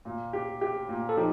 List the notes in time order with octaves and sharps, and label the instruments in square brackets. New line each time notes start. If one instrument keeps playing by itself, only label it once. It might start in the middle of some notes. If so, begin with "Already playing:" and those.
[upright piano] A#2
G4
G4
A#2
[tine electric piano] A4
[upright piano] F3 [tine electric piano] D#4 G4